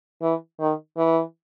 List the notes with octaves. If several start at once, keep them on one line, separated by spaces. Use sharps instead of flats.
E3
D#3
E3